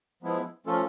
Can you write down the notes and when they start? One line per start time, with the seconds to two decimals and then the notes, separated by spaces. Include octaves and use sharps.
0.23 F3 G#3 B3 E4
0.66 F3 A3 C#4 F4 A4